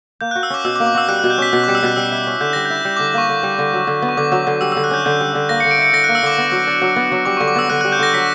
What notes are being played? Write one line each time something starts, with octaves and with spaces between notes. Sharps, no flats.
A#3 G6
F#6
F#4
E6
C#4 D6
B2 E6
D6
A#3
D6
F#4 E6
G3 F#6
F#6
B2
G6
C#4 B6
B2
D6
G3
E6
B2 F#6
G3 E6
E4
C#4
D3 G6
G3 A#6
E4 G6
G3 G6
D6
D3
A#3 C#6
D3
G3
D3
F#3
D3
B3
C#6
D3 D6
F#3
D3
G3 E6
E6
D3
F#6
C#4 G6
D3 G6
G3
D3
A#3 A#6
C#7
D3
D7
E4 C#7
D3 A#6
F#6
A#3
E6
D3 D6
B3
F#3
D4
F#3
B3
F#3
G3 D6
C#6
D3
D6
B3 E6
D3 F#6
F#6
G3
G6
D3 A#6
F#3 B6